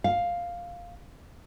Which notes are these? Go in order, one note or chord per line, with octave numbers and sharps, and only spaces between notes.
F5